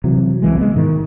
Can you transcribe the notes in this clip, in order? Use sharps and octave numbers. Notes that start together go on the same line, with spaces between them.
C3 E3 F#3
C2 E3 G#3
G#3 B3
G#2 D#3